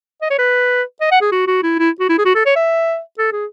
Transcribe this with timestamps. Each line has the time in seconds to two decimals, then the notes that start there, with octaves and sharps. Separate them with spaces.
0.22 D#5
0.30 C#5
0.39 B4
1.01 D#5
1.11 F#5
1.21 G#4
1.32 F#4
1.47 F#4
1.63 E4
1.79 E4
2.00 F#4
2.09 E4
2.18 G#4
2.25 F#4
2.35 A4
2.46 C#5
2.56 E5
3.18 A4
3.32 G#4